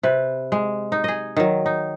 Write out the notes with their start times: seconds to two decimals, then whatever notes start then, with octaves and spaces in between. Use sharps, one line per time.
0.03 C3 B4
0.52 G#3
0.92 D#4
1.04 G#4 D#5
1.37 D#3 F#3
1.66 D#4